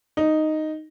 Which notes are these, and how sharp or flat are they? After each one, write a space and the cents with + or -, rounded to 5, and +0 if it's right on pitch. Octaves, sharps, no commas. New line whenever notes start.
D#4 -5